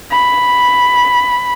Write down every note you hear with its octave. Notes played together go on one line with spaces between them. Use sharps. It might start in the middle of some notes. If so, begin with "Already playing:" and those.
B5